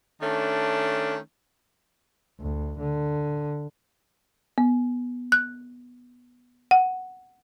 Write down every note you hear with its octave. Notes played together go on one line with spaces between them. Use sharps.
D#3 A3 C#4 D4
D2
D3
B3
F#6
F#5